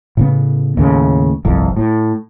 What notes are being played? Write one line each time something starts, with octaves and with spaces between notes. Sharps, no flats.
A2 C#3 B3
D#2 A2 C#3
G1 C2 F2
A2